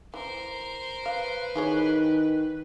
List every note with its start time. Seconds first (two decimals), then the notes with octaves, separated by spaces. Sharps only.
0.14 E3 A#4 C5
1.06 B4 F5
1.56 D#3 E4 G#4 C#5